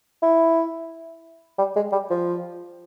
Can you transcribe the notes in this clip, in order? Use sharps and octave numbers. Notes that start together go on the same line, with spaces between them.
E4
G3
G#3
G3
F3